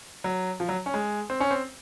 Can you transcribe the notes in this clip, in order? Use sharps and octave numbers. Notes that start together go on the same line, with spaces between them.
F#3
F3
F#3
C#4
G#3
C4
C#4
C4